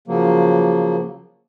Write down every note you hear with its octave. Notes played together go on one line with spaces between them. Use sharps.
C#3 F3 F#3 A#3